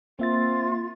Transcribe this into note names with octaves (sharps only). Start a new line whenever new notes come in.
A#3 C4 F4 E5 A6